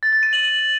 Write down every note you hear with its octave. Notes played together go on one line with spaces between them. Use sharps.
A6
A6
D#7
F#7